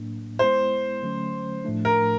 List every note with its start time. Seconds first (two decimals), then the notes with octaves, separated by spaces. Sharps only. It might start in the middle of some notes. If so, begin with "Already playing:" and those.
Already playing: A2 F#3 A#3 D4
0.39 G#3 B3 E4 C5
1.02 D3 F#3 A3 C#4
1.65 A2 F3 A3 D4
1.85 A#4